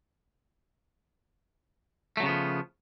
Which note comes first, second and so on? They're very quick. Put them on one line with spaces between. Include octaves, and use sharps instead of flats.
A3 F#3 C#3 B3 F3